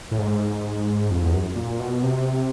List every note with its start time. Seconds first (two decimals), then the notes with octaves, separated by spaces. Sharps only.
0.11 A2
0.19 G#2
1.11 F2
1.22 E2
1.33 F#2
1.56 A#2
1.80 B2
2.03 C3